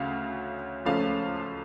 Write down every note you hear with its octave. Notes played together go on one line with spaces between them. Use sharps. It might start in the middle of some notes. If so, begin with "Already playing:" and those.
Already playing: D2 C#3 C#4 F5
C#2 C#3 F3 A3 C#4 F5